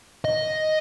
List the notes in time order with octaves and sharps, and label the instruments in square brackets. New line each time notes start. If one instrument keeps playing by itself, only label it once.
[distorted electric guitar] D#5